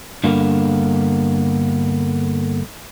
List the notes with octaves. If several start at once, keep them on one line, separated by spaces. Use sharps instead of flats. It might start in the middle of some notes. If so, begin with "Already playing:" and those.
G2 D3 A#3 B3